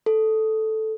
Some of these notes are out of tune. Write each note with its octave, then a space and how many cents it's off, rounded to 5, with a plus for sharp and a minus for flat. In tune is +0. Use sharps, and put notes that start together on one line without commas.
A4 -5